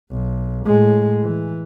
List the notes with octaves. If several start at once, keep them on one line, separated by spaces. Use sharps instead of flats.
B1
A2 G#3
E3